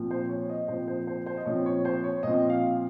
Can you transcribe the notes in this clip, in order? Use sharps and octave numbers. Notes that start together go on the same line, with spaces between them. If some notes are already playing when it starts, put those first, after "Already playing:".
Already playing: A#2 F3 C4
C5
C#5
D#5
A#2 F3 C4 C5
C5
C5
C5
D#5
A#2 F3 C4 C#5
C#5
C5
C#5
A#2 F3 C4 D#5
F5